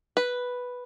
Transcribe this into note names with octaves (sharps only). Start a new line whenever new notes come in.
B4